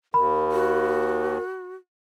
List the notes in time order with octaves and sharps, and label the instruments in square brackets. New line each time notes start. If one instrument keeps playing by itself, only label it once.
[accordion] D#2 [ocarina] A#4 [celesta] B5
[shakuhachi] F#4